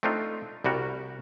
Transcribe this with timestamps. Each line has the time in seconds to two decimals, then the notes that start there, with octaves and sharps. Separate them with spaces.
0.03 A3 C4 D4 D#4 F4
0.64 C2 G3 F#4 A#4